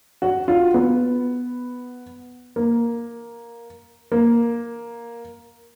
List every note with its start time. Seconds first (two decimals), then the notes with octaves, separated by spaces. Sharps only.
0.22 F#4
0.48 F4
0.74 B3
2.56 A#3
4.12 A#3